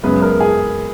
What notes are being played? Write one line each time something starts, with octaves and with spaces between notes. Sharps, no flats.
F#2 C#3 G#3 B3 B4
A#4
G#4